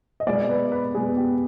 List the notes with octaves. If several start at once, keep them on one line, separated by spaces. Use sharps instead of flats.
D#5
B2 G#3 B3 D5
B4
B4
B2 G#3 B3 G#4
G4